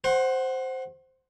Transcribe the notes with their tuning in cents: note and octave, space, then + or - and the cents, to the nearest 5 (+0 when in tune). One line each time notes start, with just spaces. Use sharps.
C5 +0 F#5 +10 C6 +40